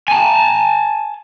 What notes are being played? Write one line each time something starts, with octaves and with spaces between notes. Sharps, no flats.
G#5 A5